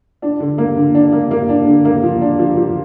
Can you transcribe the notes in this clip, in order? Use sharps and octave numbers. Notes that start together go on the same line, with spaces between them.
D4
D3
A#3
D3
D4
A#3
A#3
D4
D3
A#3
F3
D4
F3
F3